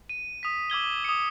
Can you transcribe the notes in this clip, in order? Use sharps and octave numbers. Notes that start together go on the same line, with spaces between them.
D#7
D#6 B6
D6 E6 G#6 G7
D#6 C#7